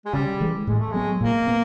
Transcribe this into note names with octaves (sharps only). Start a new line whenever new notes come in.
G#3
C#3 G3
E3 G#3
A2 G#3
A3
F#3 G#3 B3
A#2 A#3
B3